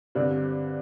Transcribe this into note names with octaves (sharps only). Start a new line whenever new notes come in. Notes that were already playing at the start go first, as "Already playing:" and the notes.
G2 D3 G3 C4